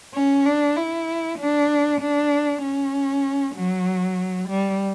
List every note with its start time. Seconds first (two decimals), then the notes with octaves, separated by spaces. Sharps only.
0.14 C#4
0.45 D4
0.76 E4
1.39 D4
2.01 D4
2.62 C#4
3.55 F#3
4.48 G3